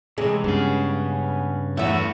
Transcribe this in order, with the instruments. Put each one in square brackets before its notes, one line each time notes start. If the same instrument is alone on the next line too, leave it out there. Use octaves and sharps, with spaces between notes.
[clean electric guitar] C3 E3 [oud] G#3
[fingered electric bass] G2 [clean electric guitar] C#3 G#4 [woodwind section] B3 C#4
[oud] E2 E5 [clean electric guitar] A3 B3 F#4